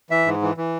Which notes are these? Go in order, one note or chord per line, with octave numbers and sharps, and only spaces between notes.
E3 E5
G#2
E3
E3